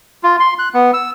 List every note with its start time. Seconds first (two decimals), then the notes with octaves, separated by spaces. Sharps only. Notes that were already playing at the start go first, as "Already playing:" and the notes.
0.23 F4
0.40 C6
0.59 F#6
0.74 B3
0.94 E6